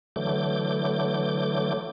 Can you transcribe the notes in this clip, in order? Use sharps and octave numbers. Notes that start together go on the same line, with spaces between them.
D3 E3 F#3 A3 D6 G6